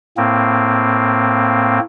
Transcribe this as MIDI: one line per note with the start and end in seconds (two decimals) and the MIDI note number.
0.17 1.79 45
0.17 1.79 58
0.17 1.79 60